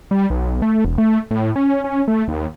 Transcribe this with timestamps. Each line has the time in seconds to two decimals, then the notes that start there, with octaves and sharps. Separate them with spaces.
0.11 G3
0.30 B1
0.62 A3
0.85 E1
0.98 A3
1.31 A2
1.56 C#4
1.84 C#4
2.08 A3
2.28 D#2